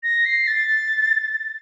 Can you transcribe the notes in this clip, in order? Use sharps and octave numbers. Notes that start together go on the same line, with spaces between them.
A#6
C7
A6